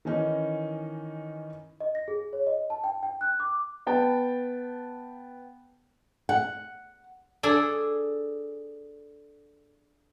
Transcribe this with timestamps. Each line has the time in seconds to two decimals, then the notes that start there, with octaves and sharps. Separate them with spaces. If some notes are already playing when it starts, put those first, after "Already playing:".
0.05 D#3 E3 C#4 D#4
1.80 D#5
1.95 A#6
2.08 G#4
2.33 C#5
2.47 D#5
2.70 A5
2.84 G5
3.03 G5
3.21 F#6
3.40 D6
3.87 B3 G5 A5
6.29 F#5
7.43 D4 G#4 A4